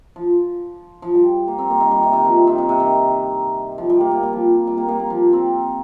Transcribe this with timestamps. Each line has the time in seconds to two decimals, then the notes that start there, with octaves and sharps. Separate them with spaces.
0.16 F3
1.02 F3
1.15 G3
1.48 A#3
1.58 C4
1.70 A#3
1.80 D#3
1.91 G3
2.03 C3
2.13 D#3
2.25 F3
2.36 C3
2.47 D#3
2.58 C3
2.69 C3
2.80 D#3
3.78 F3
3.90 G3
4.01 A#3
4.11 A#3
4.23 G3
4.33 F3
4.67 G3
4.78 A#3
4.89 A#3
4.99 A#3
5.10 F3
5.33 C4